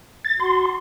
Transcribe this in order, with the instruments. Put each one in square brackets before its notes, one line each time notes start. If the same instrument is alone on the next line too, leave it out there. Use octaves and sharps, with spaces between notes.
[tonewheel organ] A6
[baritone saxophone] F#4 [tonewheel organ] C6